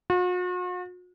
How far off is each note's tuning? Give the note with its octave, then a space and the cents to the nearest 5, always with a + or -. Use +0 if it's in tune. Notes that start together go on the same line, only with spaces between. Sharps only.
F#4 -45